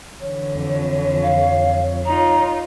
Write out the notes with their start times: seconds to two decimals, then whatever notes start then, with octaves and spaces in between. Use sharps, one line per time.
0.21 D3 E3 C#5
0.55 F2
1.23 F5
2.05 D#4 F4 A#5